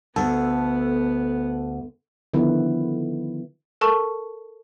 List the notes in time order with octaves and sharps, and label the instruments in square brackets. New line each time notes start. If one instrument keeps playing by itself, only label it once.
[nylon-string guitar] D2 [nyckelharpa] B3 [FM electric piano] A4
[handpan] D3 D#3 F3 B3 E4 B4
[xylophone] A4 A#4 A5 C#6